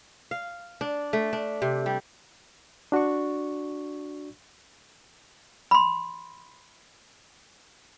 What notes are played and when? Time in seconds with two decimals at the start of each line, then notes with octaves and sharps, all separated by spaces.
0.31 F5
0.81 D4
1.13 A3
1.33 D4
1.62 C3
1.86 G3
2.92 D4 F#4 D5 C#6
5.71 B5 C6